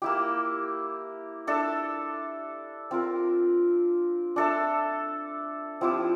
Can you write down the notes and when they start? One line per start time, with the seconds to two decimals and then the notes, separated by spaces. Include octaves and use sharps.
0.02 A#3 E4 G4
1.47 D4 A4 E5
2.91 C4 F4 A#4
4.36 D4 A4 E5
5.81 F3 C4 E4 G4